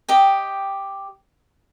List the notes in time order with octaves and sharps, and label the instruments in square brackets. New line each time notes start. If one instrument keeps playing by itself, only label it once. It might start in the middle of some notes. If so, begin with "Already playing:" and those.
[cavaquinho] G4 D#5 G5